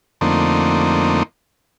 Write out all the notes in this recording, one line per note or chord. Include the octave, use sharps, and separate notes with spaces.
F2 D3 A3 A#3 C4 D#4